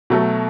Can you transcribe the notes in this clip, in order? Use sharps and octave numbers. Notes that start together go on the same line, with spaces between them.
B2 F#3 A3